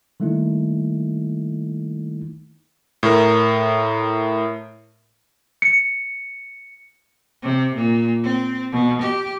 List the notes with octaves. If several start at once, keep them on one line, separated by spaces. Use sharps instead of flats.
D#3 G3 A3 A#3 D#4 E4
A2 A#4
C#7
C3
A#2
C4
B2
G4